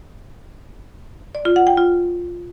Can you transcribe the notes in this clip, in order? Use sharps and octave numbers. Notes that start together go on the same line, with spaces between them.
D5
F4
F#5
G5
F4